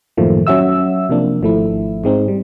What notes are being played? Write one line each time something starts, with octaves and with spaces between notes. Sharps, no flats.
F#2 A2 D#3 F3 A3 A#3
F#3 C#4 F#4 E5 E6
C3 F3 A#3 D4
G#1 F3 A3 E4
G#2 G#3 C4 D#4
G3